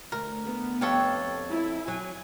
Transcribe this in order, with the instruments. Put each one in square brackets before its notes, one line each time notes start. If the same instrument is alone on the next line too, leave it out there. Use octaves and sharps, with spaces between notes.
[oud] D2 [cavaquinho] A#4
[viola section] B3
[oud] F2 G4 [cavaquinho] A4 C#5 F5
[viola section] E4
[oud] F#3 [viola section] G#5